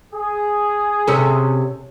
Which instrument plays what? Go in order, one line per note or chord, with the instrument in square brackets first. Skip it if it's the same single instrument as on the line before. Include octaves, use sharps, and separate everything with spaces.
[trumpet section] G#4
[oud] C3 C#4 A4